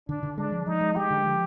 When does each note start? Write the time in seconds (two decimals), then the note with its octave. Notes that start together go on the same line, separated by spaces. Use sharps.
0.09 D3 D4
0.23 D3
0.38 G#3 D4
0.52 F3
0.66 F3 D#4
0.81 G#3
0.96 G#3 G4
1.11 D3
1.25 F3